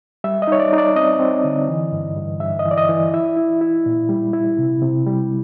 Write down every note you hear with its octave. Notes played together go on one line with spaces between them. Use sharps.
G3 E5
D#5
D#4 C#5
D5
D#4
D5
C4 D#5
C4
D3
E3
G2
G2
G2 E5
D#5
E3
D5
D#5
E3
E4 E5
E4
E4
A#2
G3
E4
C3
C3
G3